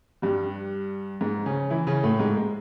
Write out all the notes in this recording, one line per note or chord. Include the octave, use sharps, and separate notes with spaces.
G2 G3
G#2 G#3
C#3 C#4
E3 E4
C#3 C#4
A2 A3
G#2 G#3
G#3